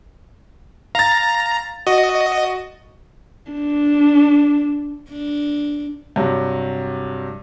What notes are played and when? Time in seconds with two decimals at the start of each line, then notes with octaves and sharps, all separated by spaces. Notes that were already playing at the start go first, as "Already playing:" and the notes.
0.95 F5 A#5 A6
1.87 F#4 D#5
3.52 D4
5.10 D4
6.16 G2 C3 F#3